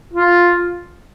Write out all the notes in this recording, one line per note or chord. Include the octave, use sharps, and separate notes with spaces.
F4